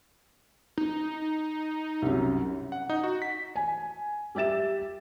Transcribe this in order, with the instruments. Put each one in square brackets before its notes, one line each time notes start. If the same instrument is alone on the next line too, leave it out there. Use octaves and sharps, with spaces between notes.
[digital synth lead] D#4
[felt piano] C2 F#2
[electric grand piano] F#5
D#4
F#4
B6
[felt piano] G#5
G3 G4 E5 A6 E7